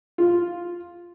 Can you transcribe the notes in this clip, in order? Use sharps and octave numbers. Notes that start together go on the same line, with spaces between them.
F4